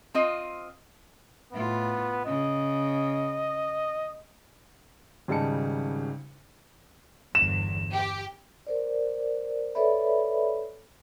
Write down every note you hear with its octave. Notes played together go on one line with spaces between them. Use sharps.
C4 F4 D#5
A2 B3 F4
C#3 D#5
G#1 C#3 G3 D#4 A5 C#7
G1 E2 E7
G4
A#4 C5 D5
A4 B4 C#5 D5 E5 B5